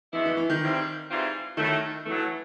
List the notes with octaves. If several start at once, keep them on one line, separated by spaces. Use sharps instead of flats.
B2 E3 G#3 B3 E4
E3
E3
D#3
G#2 E3 G3 C4 F4
G#2 E3 G3 C4 F4
A2 D#3 F#3 A3
A2 E3 F#3 A3